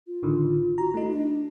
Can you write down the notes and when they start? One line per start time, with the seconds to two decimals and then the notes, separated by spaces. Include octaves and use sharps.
0.07 F4
0.23 A1 D3 D#3
0.78 F#4 A#5
0.94 A3 D#4 E4
1.09 D4